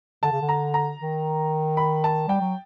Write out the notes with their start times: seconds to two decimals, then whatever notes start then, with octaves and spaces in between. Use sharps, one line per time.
0.23 D3 A5
0.32 C#3
0.42 D3
0.49 A#5
0.74 A#5
1.00 D#3
1.77 B5
2.04 A5
2.28 G3 G5
2.41 F#3